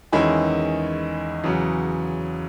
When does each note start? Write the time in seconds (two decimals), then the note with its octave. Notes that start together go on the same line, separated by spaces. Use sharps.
0.13 E2 D#3 G#3 C#4 E4
1.44 E2 C#3 F#3